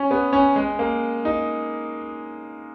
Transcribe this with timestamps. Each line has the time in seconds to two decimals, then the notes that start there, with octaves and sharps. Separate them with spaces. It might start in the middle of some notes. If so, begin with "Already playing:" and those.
Already playing: C#4
0.11 B3
0.33 C#4
0.56 G#3
0.79 A#3
1.25 D#4